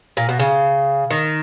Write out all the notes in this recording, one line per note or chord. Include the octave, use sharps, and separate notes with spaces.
A#2
B2
C#3
D#3